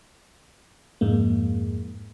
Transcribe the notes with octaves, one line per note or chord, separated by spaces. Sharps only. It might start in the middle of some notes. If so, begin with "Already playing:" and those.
F2 G#2 G#3 A#3